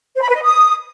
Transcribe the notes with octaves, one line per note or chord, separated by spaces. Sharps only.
C5
B5
B4
D#5
D#6